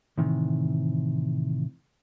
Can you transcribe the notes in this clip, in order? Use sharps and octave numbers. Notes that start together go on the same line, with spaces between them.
A2 C3 D#3 E3